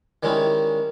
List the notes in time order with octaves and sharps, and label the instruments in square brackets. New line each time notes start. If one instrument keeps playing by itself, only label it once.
[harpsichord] D#3 G3 G#3 C#4 D#4 E4